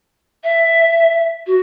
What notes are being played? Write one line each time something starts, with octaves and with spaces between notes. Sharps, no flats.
E5
F#4